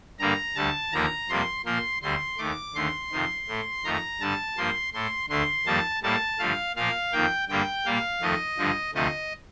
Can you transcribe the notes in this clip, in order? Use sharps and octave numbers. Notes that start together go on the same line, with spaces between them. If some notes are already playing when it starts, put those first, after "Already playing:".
G2 D3 G3 A#3 A#5
D2 D3 G3 A5
D#2 D3 F3 A#3 A#5
F2 C3 G3 A#3 C6
A#2 F3 A#3 C6
D2 D3 G3 C6
D#2 D#3 A3 D6
D#2 D3 A3 C6
F2 C3 D#3
A2 A3
F2 D#3 A3 A#5
G2 D3 G3 A5
G2 F3 A#3 C6
A2 A3 C6
D2 D3 A3 C6
F2 D#3 G3 A#3 A5
A2 G3 A#3 A5
G2 D3 F3 A3 F5
A#2 F3 A#3 F5
F2 D#3 A#3 G5
G2 D3 G3 A#3 G5
A#2 G3 A#3 F5
F2 D#3 A3 D#5
G2 D3 F3
D2 C3 F3 A3 D#5